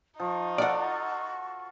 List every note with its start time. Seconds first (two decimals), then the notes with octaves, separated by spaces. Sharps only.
0.20 F3 D#4 C#6
0.58 F4 F#4 A4 D5 F#5